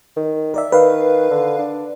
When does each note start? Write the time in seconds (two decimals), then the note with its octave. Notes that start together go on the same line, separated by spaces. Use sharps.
0.16 D#3
0.54 A#4 D5 E5
0.72 D#3 B4 F5
1.30 D3
1.59 D4